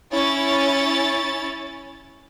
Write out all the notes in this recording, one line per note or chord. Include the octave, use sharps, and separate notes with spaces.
C#4 E4 C#5 A6